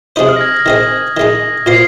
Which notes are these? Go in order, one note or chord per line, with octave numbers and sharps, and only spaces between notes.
C3 G#3 D#4 C5 D#6
F6
A#6
G#6
A#6
D#3 C4 G#4 D#5 A#6
D#3 G#3 D#4
A#2 A#3 F4 C5 C7